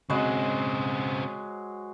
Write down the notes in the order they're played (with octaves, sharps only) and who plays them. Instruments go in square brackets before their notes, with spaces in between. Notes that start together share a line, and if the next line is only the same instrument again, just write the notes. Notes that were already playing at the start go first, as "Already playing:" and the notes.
[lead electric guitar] C#3 C4 [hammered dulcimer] F#3 G#3 C5